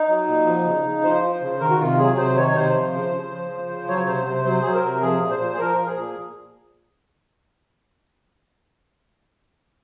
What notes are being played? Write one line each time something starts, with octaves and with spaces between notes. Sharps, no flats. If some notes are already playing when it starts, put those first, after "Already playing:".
Already playing: D#4
F#3
A#2
F3
C#3
C#3
F3 C5
F3
C5
C#3
D#3 A#4
F#4
C3 F4
F#3 G#4
C3 C5
D#3 C#5
C3 C5
F3
C#3
C#3
F3
F3
C#3
F#3 C#5
C3 C5
C3 C5
F#3 C5
F#3 G#4
A#4
C3
F3 G#4
A#2
C5
A#2
G#4
F3 A#4
F3
G#4
A#2